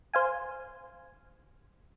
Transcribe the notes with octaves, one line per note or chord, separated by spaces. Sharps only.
C5 F5 G#5